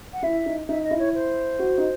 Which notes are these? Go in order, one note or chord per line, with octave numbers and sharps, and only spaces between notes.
F#5
E4 E5
D#4
D#4 E5
D#5
E4
C#5
C5
F#4
D#4